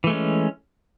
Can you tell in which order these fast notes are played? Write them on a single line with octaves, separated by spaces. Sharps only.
E3 A3 G#3 C#4